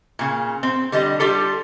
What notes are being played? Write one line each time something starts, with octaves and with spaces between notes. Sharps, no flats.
A#2 C#3
C4
D3 G3 D#5
G3 F4 G4 A4